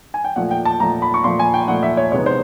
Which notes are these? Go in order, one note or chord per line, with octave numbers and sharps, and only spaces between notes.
G#5
G5
A#2 F3 A3 F#5
G5
A5
A#2 F3 A3 A#5
B5
C#6
A#2 F3 A3 C6
G#5
G5
A#2 F3 A3 F#5
E5
C#5
C3 E3 G#3 B3 D#4 C#5
C5